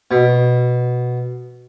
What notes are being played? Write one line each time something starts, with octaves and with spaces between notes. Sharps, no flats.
B2